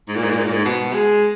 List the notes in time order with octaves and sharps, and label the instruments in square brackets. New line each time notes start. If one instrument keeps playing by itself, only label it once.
[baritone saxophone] G#2
A#2
G#2
A#2
G#2
A#2
G#2
B2
G#3